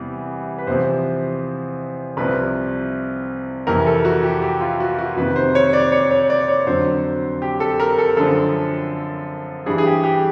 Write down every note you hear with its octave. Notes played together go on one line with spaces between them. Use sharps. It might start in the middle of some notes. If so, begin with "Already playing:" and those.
Already playing: E2 C3 E3 G3
B4
E2 C3 F3 C5
C2 C3 F3 B4
F2 C3 E3 A#4
A4
F#4
G4
G4
F4
F#4
F#4
F2 C3 D#3 B4
C5
C#5
D5
C#5
C#5
D5
C#5
F2 D3 F#3 C5
G4
A4
A#4
A4
F#2 D3 F3 A4
G2 E3 G3 G#4
G#4
G4
G4